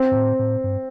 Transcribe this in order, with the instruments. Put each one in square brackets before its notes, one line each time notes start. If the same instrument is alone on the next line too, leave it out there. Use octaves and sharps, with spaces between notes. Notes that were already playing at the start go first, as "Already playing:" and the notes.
Already playing: [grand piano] C4
[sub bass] G2
A2
A2
G2